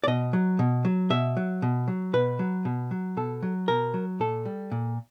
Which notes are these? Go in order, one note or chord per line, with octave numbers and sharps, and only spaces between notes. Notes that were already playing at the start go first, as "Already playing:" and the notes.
D5
B2 D#5
F#3
B2
F#3
B2 E5
F#3
B2
F#3
B2 B4
F#3
B2
F#3
B2 A4
F#3
B2 A#4
F#3
A#2 A4
G3
A#2